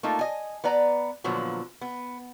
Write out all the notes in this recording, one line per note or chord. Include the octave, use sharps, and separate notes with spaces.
A3 A#3 D#4 F4
D#5 G#5
B3 B4 D5 A#5
A#2 D3 F3 F#3 B3
B3